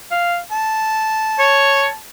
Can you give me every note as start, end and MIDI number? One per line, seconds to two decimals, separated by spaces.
0.11 0.39 77
0.51 1.96 81
1.39 1.86 73